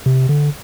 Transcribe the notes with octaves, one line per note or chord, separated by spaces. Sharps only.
C3
D3